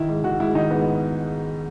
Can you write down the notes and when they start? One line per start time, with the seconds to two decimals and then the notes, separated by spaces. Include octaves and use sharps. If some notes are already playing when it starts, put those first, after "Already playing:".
Already playing: D#3 E4
0.09 G#2
0.24 D#3 F#4
0.40 G#2 E4
0.55 D#3 D#4
0.71 G#2 B3